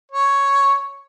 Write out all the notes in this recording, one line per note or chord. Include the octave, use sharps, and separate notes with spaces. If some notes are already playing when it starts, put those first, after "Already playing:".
C#5